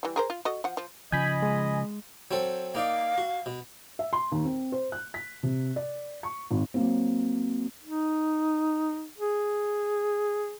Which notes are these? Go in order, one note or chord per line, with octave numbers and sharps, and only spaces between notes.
E3 G3
G#4 A#4 C5
F4
F#4 A4 D#5
F3 F#5
F3
C#3 F3 D#5 G#5 B5 G6
G#3
F#3 C4 A4
A#3 D#4 D5 F5
F#4
B2
E5
C6
D#2
C4
C5
F#6
B6
C3
D5
C#6
G#1
F#3 A#3 C4
D#4
G#4